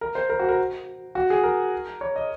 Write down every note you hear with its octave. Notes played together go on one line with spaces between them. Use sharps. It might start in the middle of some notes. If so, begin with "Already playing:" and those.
A#4
C5
A#4
F#4
A#4
F#4
G#4
A#4
C#5
D#5